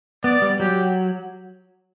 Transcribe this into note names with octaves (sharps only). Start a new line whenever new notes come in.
B3 D5
G3
F#3 G4